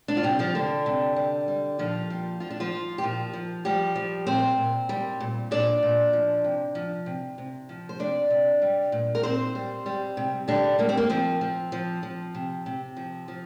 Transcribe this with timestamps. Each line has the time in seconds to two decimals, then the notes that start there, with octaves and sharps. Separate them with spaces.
0.08 D4 D5
0.17 F4
0.23 C3 G3 G4
0.39 F3 F4
0.55 D3 G3 D4
0.86 C3
1.16 G3
1.48 G3
1.79 A#2 F3 F4
2.10 G3
2.40 F3 F4
2.50 D4
2.60 F3 F4
2.72 F3
2.98 G4
3.03 A#2 F3 F4
3.33 F3
3.65 F3 G3 G4
3.96 F3
4.27 A#2 C4 C5
4.58 A#2
4.89 G3
5.20 A#2
5.51 A#2 D4 D5
5.83 A#2
6.13 F3
6.44 C3
6.75 F3
7.06 C3
7.38 C3
7.69 F3
7.89 C5
7.99 C3 D4 D5
8.30 C3
8.62 G3
8.92 A#2
9.15 A#4
9.23 A#2 C4 C5
9.55 G3
9.86 G3
10.17 C3
10.48 D3 G3 D4
10.78 G3 A#3
10.89 C4
10.97 A#3
11.09 F3 C4
11.41 F3
11.72 F3
12.03 F3
12.35 C3
12.66 C3
12.96 F3
13.28 F3